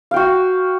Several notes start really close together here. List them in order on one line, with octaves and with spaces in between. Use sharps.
F5 G5 F#4